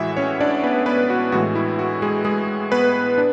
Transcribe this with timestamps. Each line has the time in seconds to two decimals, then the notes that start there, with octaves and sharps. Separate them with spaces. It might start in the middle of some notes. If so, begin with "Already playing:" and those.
Already playing: A2 E3 G#3 E4 F#4 E5 F#5
0.17 C#4 C#5
0.41 D4 D5
0.63 B3 B4
0.86 B3 B4
1.10 F#4
1.32 A2 E3 G#3 F#4
1.55 E4
1.79 F#4
2.02 G#3 G#4
2.25 G#3 G#4
2.72 B3 B4
3.18 D4